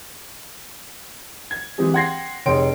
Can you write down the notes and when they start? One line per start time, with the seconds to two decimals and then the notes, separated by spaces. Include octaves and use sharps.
1.51 G#6
1.78 E3 G#3 C4 G4 G#4
1.94 F#5 G5 C6 G#6 A#6 C7
2.46 F1 G#4 C#5 G5 C6 D7